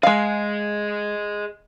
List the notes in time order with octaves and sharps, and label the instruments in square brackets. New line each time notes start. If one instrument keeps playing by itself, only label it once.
[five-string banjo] G#3 F5 [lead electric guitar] G#4 D#5